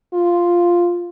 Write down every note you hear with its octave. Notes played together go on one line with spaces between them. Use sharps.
F4